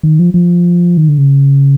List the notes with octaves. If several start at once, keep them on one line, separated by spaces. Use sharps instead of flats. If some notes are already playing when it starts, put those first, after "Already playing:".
D#3
F3
F3
D#3
D3
C#3